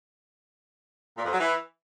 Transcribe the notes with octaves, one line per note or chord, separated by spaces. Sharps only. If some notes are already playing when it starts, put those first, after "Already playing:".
A#2
F2
F#3
E3